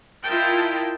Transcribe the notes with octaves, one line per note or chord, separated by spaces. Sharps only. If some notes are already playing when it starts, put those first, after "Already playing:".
E4 F4 A#4 D#5 G5 A5